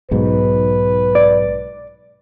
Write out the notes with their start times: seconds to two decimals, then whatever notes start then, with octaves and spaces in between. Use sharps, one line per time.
0.11 B1 G#2 B4
1.15 D5